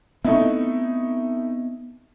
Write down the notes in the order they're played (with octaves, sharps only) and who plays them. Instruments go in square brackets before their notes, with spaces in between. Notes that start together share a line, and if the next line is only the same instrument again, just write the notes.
[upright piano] A3 D#4 E4 [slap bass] B3 C4